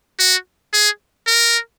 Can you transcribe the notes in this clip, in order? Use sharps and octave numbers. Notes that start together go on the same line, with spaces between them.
F#4
G#4
A#4